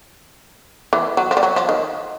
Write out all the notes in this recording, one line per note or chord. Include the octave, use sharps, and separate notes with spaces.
E3
F#3
F3
G3
F#3
F3
D#3